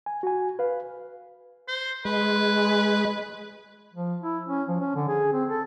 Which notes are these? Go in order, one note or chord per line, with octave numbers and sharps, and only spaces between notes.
G#5
F#4 G#5
B4 F5
C5
G#3 B4
F3
E4
C#4
F3
C#4
D3
G#4
C4
A4